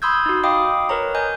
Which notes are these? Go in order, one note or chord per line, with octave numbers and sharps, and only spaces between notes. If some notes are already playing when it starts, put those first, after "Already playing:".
B5 C6 D#6 E6 G6 G#6
D#4 F#4
D#5 F5 G5 B5 D6 D#6
A#4 B4 C#5 A#5
D#5 G#5 G6